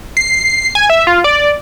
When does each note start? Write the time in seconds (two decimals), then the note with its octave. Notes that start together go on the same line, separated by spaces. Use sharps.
0.17 C7
0.75 G#5
0.90 E5
1.07 F4
1.24 D5